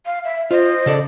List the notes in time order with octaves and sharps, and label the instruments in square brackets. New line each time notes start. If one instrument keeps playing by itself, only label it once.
[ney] F5
E5
[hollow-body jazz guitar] F4 [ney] C5 [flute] D#5
[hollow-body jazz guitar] C#3 A4 D5